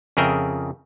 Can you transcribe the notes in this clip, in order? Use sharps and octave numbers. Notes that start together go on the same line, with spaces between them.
F2 C#3 G#4 A#4 E5 G5